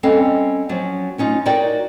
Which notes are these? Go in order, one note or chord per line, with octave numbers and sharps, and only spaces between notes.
G3 C4 C#4 A4 D#5 F5
F3 F#3 C#4
A3 C#4 D#4 F4
D#4 F#4 A#4 C#5 D5 G5